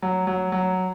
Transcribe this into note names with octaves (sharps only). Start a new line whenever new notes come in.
F#3
F#3
F#3